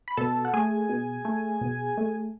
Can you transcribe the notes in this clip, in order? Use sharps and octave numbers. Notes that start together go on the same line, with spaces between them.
B5
B2 A4 A5
F#5
A3 G#4 G#5
B2
A3
B2
A3